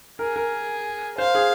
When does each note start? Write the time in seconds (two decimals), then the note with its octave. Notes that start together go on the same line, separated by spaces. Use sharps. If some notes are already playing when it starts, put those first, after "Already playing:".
0.19 G#4 A#4
0.36 A#4
1.18 C5 F5
1.35 G#4